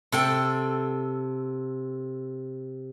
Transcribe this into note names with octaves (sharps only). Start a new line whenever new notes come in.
C3 A4 G5